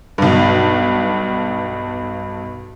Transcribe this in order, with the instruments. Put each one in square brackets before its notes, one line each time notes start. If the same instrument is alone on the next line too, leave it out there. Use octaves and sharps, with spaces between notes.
[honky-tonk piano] B1 G2